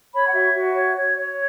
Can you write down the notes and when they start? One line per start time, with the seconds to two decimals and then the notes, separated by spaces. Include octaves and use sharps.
0.12 C#5 B5
0.26 F#5
0.32 F#4 E5
0.54 F#4
0.75 C#5
0.96 C#5
1.16 C#5